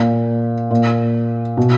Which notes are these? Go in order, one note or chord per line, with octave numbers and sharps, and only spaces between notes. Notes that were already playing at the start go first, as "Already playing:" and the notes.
Already playing: A#2
A#2
B2